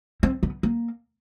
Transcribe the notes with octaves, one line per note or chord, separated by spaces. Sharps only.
C4
B3
A#3